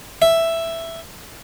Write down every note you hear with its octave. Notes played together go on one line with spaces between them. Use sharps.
E5